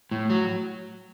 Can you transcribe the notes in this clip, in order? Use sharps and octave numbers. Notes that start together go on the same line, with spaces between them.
A2
F#3